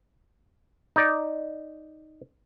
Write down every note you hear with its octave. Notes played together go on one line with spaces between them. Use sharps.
D#4 D5